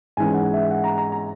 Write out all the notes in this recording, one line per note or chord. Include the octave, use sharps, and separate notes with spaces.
G#2 E3 G#3 C#4 G#5
F#5
E5
F#5
A#5
A#5
A#5